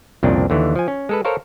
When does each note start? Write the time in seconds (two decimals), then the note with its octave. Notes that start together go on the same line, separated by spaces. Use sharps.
0.23 C2 F2 A#2 C#3 C4 D4
0.50 D#2 D3 E3
0.75 F3 G#5
0.88 C#4
1.09 G#3 A4 B4
1.25 A4 A#4 C5 C#5 F5